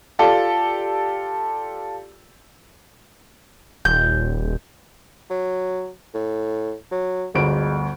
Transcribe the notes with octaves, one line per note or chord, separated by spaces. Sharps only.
F4 G4 A4 D5
D#1 G6
F#3
A2
F#3
G1 D2 G#3 D7